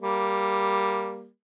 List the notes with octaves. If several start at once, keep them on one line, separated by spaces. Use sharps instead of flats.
G3 A#3